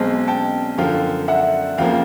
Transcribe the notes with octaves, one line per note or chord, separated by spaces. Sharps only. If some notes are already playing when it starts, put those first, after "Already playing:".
Already playing: B1 B2 G#3 C4 A5
G5 A5
F#2 D3 F3 F5 G5
E5 F#5
F1 C#3 F3 A#3 F5 G5